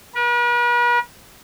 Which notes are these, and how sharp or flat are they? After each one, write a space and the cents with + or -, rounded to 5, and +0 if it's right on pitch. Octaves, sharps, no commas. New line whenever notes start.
B4 -45